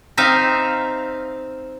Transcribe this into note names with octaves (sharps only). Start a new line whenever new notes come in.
C4 D#4 E5 F5